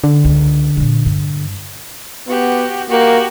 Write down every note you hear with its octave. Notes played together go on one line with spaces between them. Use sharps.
D3
C#2 C#4
A#2 D4
G2
B3 F#4 G4
A#3 F#4 G4